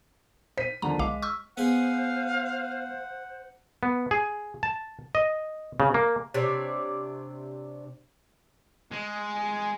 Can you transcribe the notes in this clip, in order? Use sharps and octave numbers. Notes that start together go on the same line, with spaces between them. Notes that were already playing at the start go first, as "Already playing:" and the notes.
C5 B6 D#7
D#2 D3 F3 A#5
B1 G#3 F5 D6
C#6 E6 F6
B3 G#4 C5 F5 F#5
B3
G#4
A5
D#5
C#3
A#3
C3 D4 C#5 D5
G#3
G#5